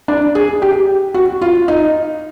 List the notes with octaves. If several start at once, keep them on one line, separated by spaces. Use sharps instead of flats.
D4
G#4
G4
F#4
F4
D#4